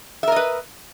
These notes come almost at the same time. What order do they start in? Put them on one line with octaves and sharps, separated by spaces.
E5 A#4 D#5 B4